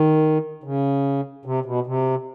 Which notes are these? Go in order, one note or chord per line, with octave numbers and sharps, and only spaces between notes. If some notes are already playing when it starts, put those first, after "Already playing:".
Already playing: D#3
C#3
C3
B2
C3